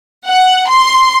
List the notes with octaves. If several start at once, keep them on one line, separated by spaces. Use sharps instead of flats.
F#5
C6